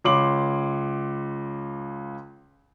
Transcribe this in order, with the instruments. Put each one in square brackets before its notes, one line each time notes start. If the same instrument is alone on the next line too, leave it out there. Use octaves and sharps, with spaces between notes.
[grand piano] C#2 C#5 C6 D6 F#7